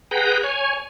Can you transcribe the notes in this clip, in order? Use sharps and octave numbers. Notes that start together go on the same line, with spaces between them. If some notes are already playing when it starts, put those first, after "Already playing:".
G#4 B4 F#5 G5 A#5
C#5 G#5